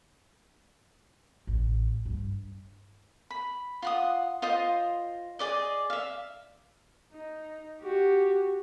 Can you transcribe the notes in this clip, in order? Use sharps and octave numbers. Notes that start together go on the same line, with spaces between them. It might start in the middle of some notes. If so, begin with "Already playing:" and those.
A1
G2
B5
F4 F#5 D#6
F4 C5 D#5 D#6
G#4 D5 D#5
E5 F5
D#4
F#4 G4